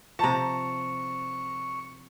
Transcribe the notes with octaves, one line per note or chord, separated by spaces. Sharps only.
C3 F3 A5 A#5 C#6